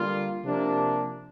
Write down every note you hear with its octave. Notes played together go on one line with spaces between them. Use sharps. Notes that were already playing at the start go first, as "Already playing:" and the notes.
Already playing: D3 G3 A#3 F4
C3 F3 A#3 D4